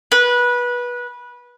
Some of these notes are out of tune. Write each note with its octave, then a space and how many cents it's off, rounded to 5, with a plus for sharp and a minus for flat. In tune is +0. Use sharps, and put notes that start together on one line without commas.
B4 -20